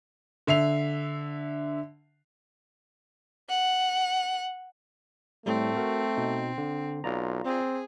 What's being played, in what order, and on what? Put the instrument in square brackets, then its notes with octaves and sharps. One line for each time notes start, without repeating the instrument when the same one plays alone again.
[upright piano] D3 E5 C7 F7
[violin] F#5
[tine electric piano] A2 G3 [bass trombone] A3 [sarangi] C4
[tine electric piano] F#4 A#4
B2 D#4
D3
[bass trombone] B1 [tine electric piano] F4 D5 A#5
[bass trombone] C4 [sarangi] G#4